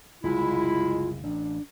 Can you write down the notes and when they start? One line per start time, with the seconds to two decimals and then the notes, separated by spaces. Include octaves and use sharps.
0.24 F#1 C2 G#3 E4 F4
1.24 A1 D4